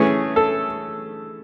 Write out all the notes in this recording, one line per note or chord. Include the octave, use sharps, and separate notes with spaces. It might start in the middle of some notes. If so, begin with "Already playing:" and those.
Already playing: E3 A3 C#4 G#4
A4